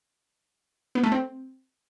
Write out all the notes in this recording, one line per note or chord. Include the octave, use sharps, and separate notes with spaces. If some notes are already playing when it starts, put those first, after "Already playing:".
B3
A3
C4